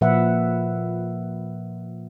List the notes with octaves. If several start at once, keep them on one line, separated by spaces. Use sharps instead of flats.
A#2 F3 B4 E5 F#5